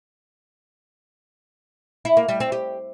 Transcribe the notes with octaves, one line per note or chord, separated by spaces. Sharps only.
E4
A#3
G3
C4
G4